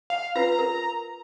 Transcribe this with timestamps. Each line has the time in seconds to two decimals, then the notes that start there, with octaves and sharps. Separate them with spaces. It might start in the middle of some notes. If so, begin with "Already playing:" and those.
0.10 F5
0.36 F4 B4 A#5
0.59 A#4